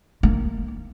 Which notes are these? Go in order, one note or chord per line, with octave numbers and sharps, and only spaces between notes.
A#3